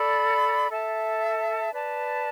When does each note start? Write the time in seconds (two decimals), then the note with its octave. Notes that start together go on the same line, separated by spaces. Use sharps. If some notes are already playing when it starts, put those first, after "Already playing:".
Already playing: A4 D5 B5
0.71 A4 E5 A5
1.72 B4 D5 A5